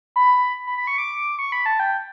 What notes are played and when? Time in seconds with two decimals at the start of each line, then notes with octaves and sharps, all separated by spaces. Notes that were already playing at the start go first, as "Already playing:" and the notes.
0.16 B5
0.67 B5
0.78 B5
0.87 C#6
0.98 D6
1.39 C#6
1.52 B5
1.66 A5
1.80 G5